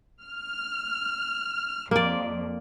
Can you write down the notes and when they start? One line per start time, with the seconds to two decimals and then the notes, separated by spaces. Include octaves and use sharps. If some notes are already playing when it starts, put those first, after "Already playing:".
0.22 F6
1.91 F2 A#3 D5